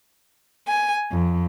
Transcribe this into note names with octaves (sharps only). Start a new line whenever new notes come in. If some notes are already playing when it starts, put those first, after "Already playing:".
G#5
F2